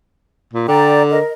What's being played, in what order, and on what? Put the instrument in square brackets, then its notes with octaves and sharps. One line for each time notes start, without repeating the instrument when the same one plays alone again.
[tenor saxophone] A#2
[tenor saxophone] D3 [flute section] D5 G5 A#5
[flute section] A#4 D#5